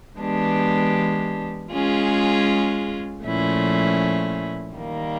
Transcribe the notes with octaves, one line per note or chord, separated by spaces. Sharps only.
E3 G#3 B3 D4 G4
G#3 C#4 F4 G#4
A#2 F3 A3 C#4 E4
D#3 G3 A#3